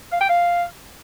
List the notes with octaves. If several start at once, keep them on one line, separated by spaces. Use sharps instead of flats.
F5
G5
F5